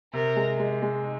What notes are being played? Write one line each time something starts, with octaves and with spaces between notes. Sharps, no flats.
C3 A#4
G#3
G#3
G#3
D#4